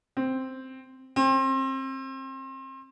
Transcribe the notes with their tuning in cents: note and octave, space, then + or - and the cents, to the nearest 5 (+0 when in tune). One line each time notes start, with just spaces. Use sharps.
C4 +0
C4 +30